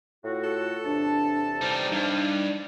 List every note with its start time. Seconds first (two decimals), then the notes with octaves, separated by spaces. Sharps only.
0.24 A2 F4 F#4
0.44 A4
0.85 E2 C3 D4 A5
1.61 G3 D#4 C5
1.92 G2 D#4